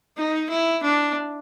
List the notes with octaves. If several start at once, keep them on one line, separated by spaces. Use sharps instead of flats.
D#4
E4
D4